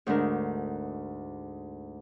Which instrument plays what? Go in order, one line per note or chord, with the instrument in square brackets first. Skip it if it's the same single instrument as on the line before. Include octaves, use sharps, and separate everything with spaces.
[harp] D2 G#2 A3 D4 A#4